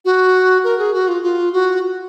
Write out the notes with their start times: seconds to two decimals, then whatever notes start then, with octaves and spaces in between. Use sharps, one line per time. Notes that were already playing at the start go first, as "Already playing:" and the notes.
0.05 F#4
0.64 A#4
0.79 G#4
0.94 F#4
1.08 F4
1.23 F4
1.53 F#4